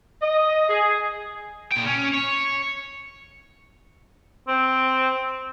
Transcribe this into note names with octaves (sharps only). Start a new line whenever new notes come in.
D#5
G#4
A#2 G5
C#4
C#5
C4